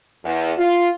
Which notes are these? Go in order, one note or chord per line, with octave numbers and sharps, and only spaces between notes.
E2
F4